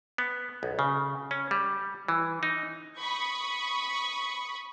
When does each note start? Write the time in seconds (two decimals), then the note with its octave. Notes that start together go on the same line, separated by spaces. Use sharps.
0.18 B3
0.63 B1
0.79 C#3
1.31 C#4
1.51 G3
2.08 E3
2.43 D#4
3.00 B5 C#6 D#6